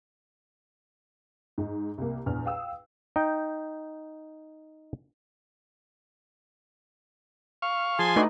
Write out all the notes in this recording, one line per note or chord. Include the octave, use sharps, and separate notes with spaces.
G#2 D#4
C2 A#3
A#1 E2 F6
F5 G5 D#6 E6
D#4 G5
F5 C#6
F3 G#4 G#5 A5 C6
A3 D4 D#4 F#4 B4